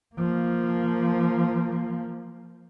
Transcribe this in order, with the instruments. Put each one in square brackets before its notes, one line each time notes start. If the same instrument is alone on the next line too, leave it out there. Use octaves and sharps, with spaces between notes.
[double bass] F3 A#3